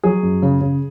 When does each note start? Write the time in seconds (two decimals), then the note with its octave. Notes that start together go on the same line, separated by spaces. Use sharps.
0.04 F#3 G#4
0.23 F#2
0.42 C#3
0.61 C#3